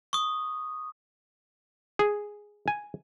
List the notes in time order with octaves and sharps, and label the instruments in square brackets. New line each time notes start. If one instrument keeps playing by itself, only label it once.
[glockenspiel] C#6 D#6
[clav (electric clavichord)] G#4
G#5